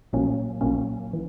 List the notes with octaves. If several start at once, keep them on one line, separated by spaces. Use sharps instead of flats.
A#1 A#2 F#3 A#3 C#4
A#1 A#2 F#3 A#3 C#4
E3